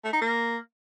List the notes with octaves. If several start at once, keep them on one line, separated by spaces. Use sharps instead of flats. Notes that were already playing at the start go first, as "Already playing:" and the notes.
A3
D#4
A#3